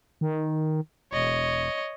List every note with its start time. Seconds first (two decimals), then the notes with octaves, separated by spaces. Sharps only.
0.21 D#3
1.12 E1 C#5 D#5